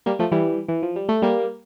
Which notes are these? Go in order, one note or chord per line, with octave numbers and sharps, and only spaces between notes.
G3 A#3
F3 A3
E3 G3
E3
F3
G3
A3
G3 A#3